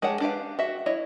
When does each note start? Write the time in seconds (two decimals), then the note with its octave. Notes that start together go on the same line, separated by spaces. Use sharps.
0.02 G#3 G4 C#5 F#5 A5
0.20 D4 G4 B4 F5
0.59 F#4 E5
0.86 E4 C#5 D#5